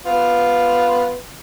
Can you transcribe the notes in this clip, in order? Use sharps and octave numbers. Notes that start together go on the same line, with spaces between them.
B3 F4